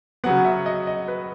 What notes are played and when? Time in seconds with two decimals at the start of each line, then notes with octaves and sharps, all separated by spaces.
0.24 C#3 F#3 B3 F#5
0.45 E5
0.66 D#5
0.87 D#5
1.08 B4